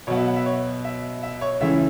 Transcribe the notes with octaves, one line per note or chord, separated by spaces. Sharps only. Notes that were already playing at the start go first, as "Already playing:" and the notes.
B2 F#3 B3 C#5
E5
F#5
E5
C#5
E5
E5
C#5
C#2 C#3 E3 A3 C#4 E5